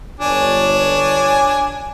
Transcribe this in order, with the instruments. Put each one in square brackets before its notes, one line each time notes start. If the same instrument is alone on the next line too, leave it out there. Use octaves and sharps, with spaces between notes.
[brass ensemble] G1 C#5 [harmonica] D4 G#5